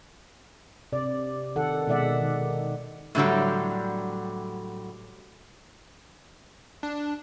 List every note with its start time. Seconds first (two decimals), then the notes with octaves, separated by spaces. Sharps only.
0.92 C3 D5
1.56 D#3 A4 F#5
1.87 B2 D#3 G#3 D5 E5 F#5
2.21 D#3
3.15 A2 D3 F#3 G3
6.83 D4